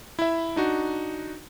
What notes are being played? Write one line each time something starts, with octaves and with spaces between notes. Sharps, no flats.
E4 E5
D4 D#4 F#4